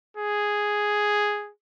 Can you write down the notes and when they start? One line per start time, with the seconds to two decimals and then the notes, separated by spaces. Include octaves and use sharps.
0.17 G#4